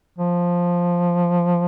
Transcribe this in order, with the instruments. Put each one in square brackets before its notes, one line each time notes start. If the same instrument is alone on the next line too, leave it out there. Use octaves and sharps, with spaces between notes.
[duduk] F3